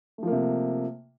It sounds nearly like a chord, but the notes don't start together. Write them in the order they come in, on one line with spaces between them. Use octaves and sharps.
A3 F3 A#3 C3